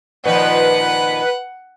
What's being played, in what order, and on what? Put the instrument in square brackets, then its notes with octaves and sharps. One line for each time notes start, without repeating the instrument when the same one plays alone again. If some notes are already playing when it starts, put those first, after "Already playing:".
[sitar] A#2 D#3 F3 [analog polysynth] B4 [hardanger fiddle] F#5